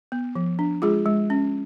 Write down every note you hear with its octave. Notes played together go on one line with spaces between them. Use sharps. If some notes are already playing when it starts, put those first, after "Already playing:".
B3
F3
D4
G#3 F4 G#4
G#3
C#4